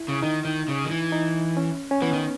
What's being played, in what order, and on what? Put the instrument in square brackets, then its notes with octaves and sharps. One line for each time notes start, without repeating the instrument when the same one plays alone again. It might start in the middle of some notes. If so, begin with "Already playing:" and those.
Already playing: [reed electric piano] E4
[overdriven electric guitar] C#3
[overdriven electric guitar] D#3 [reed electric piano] D#4
[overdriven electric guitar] D#3
C#3
D#3
E3
[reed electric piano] D#4
C#4
C#4
[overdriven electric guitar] E3 [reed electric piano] B3
[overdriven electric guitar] D#3